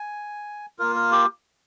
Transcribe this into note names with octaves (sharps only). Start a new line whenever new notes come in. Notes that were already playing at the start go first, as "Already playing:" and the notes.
Already playing: G#5
A#3 F4 A#4
A#4
G4